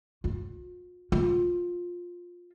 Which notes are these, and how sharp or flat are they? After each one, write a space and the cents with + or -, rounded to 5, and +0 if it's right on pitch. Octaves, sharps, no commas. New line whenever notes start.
F4 +45
F4 +15